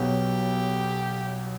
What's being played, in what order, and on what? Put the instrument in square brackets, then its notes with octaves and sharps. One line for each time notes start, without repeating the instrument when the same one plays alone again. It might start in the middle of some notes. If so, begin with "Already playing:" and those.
Already playing: [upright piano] B1 B2 F#3 [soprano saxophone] G4